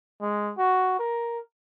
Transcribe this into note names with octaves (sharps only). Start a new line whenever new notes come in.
G#3
F#4
A#4